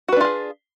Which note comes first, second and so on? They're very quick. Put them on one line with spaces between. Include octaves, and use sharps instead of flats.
F#4 B4 D4 F4 G#4